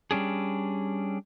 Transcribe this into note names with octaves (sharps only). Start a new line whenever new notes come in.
G3 C#4 D4 G#4